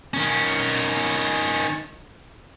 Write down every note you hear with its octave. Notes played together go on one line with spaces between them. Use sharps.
D#3 C#4